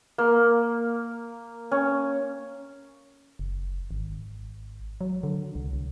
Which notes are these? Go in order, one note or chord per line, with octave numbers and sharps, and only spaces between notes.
A#3
C#4
F#1
G#1
F#3
D3
C2
C2